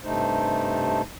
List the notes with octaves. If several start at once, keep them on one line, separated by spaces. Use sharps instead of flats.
G2 C3 A3 D#4 C5